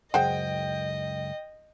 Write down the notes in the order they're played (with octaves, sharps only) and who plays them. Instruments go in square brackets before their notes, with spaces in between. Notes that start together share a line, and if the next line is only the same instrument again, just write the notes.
[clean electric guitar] C#2 F#2 [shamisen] G#4 C5 F#5 [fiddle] D#5 [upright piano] G5